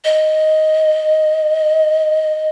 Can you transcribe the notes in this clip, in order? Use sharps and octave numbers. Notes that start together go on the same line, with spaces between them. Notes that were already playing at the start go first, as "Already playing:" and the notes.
D#5